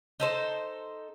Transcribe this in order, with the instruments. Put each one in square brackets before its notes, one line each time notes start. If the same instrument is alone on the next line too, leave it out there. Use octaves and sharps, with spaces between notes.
[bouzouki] D#4 A4 C5